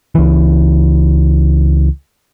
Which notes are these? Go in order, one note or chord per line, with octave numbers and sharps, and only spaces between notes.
C#2 E3